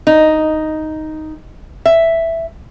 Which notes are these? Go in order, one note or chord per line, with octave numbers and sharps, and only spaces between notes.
D#4
E5